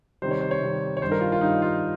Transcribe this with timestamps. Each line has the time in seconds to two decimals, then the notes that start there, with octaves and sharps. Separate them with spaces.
0.22 C3 D#3 G3 C5
0.31 C#5
0.41 C5
0.51 C#5
0.61 C3 D#3 G3
0.97 C#5
1.01 G2 D#3 G3 C5
1.12 A#4
1.21 F4
1.32 F4
1.41 G2 D#3 G3 D#4
1.62 F4